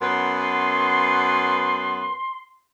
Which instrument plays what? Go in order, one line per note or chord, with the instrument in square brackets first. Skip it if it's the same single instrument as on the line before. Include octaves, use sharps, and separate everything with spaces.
[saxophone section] F#2 B3 B4 [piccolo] C6